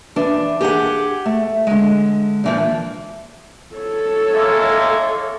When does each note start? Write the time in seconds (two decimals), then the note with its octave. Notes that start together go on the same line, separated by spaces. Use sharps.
0.16 E3 D4
0.61 G4 G#4 F5 F#5
1.26 A3
1.67 D3 G#3
2.44 A#2 E3 F3
3.75 A4 C#5
4.34 G#3 A#3 E5